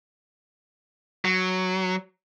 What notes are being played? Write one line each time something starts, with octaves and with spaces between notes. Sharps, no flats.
F#3